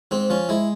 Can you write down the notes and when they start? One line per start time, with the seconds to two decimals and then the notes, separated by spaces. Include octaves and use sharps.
0.11 G#2 C4
0.30 F3 C#4
0.49 G#3 E4